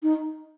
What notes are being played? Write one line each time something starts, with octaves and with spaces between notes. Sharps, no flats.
D#4